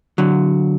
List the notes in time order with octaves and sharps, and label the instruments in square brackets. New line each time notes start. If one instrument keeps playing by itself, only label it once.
[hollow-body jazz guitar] D3 F#3